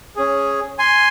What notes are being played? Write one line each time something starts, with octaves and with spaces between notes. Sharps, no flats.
C#4 G#4
G#5 C6